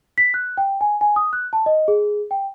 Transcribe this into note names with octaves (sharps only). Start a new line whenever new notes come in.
B6
F#6
G5
G#5
G#5
D#6
F#6
A5
D#5
G#4
G5